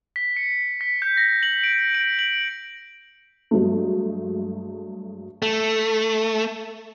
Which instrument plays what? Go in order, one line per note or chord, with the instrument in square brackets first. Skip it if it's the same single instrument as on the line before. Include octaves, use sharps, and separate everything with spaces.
[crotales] B6
C#7
B6
G6
A#6
F#7
D7
D7
F#7
[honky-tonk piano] G2 F#3 G#3 A3
[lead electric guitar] A3